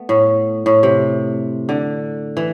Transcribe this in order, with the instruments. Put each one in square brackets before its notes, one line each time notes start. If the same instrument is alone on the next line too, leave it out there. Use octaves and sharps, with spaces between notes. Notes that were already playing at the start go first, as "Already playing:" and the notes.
Already playing: [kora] A3 B3
A2
A2
C3
D3
E3